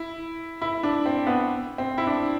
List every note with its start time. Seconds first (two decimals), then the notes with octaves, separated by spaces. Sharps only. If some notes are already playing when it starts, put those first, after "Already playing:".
Already playing: E4
0.62 E4
0.83 D4
1.06 C4
1.27 B3
1.78 C4
1.98 E4
2.07 D4